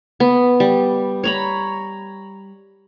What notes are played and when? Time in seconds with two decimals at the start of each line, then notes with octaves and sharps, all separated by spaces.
0.20 B3
0.60 G3
1.24 C#5 A#5 B5